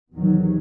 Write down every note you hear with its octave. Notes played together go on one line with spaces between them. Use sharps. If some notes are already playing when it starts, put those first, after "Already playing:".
E2 C3 D#3 F#3